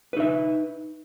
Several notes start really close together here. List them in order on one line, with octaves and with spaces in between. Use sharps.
B4 D#4 E5